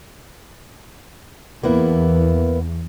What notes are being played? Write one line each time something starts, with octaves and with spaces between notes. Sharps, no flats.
E2 A#3 B3 E4